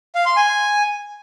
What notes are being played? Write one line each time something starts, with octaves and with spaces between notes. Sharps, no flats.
F5
C6
G#5